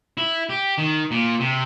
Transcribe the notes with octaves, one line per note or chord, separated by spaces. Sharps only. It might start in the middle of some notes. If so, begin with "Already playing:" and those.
E4
G4
D#3
A#2
C3